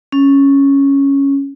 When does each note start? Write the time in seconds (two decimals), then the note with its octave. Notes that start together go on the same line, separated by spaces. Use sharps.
0.12 C#4